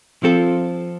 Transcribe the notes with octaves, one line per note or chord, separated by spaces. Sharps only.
F3 C4 F4 A4